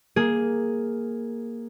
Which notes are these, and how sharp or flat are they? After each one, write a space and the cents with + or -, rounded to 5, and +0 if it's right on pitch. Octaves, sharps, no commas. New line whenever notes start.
A#3 +0 G#4 +0